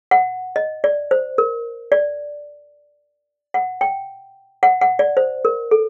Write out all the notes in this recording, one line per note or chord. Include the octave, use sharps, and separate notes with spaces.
F#5
D#5
D5
C5
A#4
D5
F#5
G5
F#5
F#5
D5
C5
A#4
A4